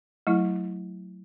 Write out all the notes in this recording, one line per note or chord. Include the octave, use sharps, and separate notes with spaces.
F#3 A3 E4